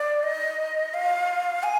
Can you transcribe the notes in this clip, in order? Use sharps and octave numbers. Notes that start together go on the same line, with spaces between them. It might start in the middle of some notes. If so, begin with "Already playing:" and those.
Already playing: D5
D#5
F5
G#5